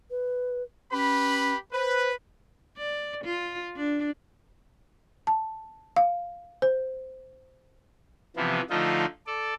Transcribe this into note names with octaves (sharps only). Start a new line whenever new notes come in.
B4
C#4 G4 B4 B5
B4 C5
D5
F4
D4
A5
F5
C5
C3 E3 F3 B3
D3 F3 A3 D#4 F4 D#5
A4 D5